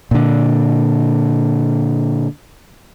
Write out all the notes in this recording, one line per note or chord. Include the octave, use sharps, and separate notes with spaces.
A#2 D3